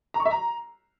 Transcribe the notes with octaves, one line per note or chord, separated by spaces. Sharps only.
A#5
C#6
E5
A#5